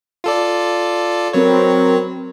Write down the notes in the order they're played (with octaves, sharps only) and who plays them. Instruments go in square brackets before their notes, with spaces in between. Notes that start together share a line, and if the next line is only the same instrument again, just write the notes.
[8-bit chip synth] F4 A4 D5
[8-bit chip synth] F#3 C#5 [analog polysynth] C4 A#4 B4